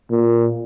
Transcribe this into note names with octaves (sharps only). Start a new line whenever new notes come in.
A#2